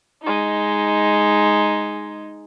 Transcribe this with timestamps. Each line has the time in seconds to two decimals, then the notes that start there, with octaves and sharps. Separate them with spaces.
0.22 G#3 D#4